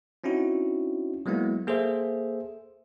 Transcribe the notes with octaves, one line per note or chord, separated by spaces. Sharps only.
C4 C#4 D#4 E4 F#4
F#3 G#3 A#3 B3 E4
A#3 G#4 A4 C5 E5